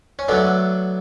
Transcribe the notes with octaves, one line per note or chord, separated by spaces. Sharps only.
C#4
D3 F#3 A3 B3 D4